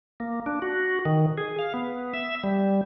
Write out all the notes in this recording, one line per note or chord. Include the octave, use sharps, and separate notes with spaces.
A#3
D4
F#4
D#3
G#4
F5
B3
E5
G3